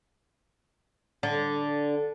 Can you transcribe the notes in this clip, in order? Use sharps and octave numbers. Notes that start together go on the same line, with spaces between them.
D3